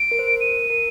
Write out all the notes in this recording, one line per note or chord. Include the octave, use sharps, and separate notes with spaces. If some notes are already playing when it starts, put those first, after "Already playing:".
Already playing: D7
A#4
C5
A#4
D#7
A#4